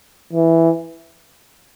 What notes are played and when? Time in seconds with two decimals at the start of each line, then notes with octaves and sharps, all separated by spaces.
0.33 E3